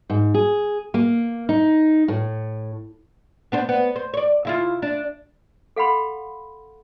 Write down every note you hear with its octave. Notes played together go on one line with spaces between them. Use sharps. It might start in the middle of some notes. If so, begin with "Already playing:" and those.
G#2
G#4
A#3
D#4
A2
B3 D4 C5
B3
C5
C#5 D5
C#3 E4 F4
D4
A4 F5 F#5 B5 C6